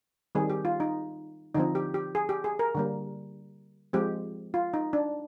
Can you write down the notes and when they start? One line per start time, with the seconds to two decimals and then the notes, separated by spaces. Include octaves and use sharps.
0.35 D#3 G3 C4 G#4
0.50 G4
0.65 F4
0.80 D#4
1.55 D3 F3 C4 D#4
1.75 G4
1.94 G4
2.15 G#4
2.29 G4
2.44 G#4
2.59 A#4
2.75 D3 G3 A#3
3.93 F3 G#3 C4 G4
4.54 F4
4.74 D#4
4.93 D4